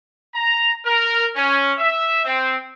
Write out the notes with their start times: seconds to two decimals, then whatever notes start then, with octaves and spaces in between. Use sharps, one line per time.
0.34 A#5
0.85 A#4
1.35 C#4
1.77 E5
2.25 C4